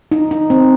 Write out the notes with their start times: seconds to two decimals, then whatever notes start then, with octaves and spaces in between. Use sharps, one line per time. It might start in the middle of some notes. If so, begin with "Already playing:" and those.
0.12 D#4
0.31 D#4
0.50 C4